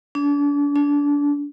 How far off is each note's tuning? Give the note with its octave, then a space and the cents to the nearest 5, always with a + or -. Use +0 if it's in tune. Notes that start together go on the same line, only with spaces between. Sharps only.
D4 -35
D4 -25